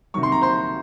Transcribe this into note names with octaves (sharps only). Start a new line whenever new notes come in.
C3 D#3 F#3 C#6
C6
A#5
C5 C6